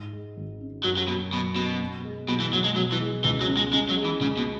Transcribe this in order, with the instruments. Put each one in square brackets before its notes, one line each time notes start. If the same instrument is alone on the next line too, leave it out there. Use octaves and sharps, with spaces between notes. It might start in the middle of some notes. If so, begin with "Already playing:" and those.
Already playing: [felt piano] G#2
G#3
G#1
C#4
[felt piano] F#2 [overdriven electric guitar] F#3
[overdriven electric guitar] F#3
[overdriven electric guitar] B2 [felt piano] F#3
[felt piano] F#1 [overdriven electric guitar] B2
[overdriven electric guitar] B2 [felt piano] B3
[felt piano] B2
G#3
[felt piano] B1 [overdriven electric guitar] B2
[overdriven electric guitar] E3
[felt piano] B1 [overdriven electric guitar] F#3
[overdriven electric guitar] G#3
[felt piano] B2 [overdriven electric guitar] F#3
[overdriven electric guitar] E3
[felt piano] G#3
[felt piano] C#2 [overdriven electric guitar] E3
[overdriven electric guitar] F#3
[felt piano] C#4
[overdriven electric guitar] G#3
[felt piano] C#3 [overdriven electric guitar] G#3
[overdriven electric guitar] F#3
[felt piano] G#3
[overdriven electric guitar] E3
[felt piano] C#2 [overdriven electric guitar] C#3
[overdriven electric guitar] B2